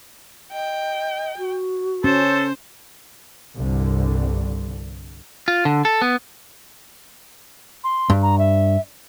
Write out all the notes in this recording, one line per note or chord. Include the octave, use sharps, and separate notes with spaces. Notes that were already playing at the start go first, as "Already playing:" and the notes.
D#5 G5
F#4
C#4 A4 C5
C2 G2 D3
F4
D3
A4
B3
C6
G2
A#5
E5